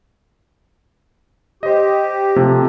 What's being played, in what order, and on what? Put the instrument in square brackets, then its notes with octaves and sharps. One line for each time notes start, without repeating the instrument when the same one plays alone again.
[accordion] G4 [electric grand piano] C5 D#5
[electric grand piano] C3 F3 A3